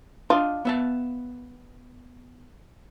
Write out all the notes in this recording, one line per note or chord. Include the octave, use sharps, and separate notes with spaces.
D4 F4 D#5
B3 E5 A5